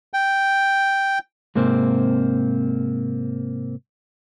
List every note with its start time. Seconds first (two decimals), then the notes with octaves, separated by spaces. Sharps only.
0.14 G5
1.56 G#2 C3 A#3 C4